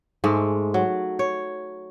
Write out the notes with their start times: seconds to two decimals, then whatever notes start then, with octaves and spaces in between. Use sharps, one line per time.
0.24 G#2 G#3 A3
0.74 F#3
1.19 C#5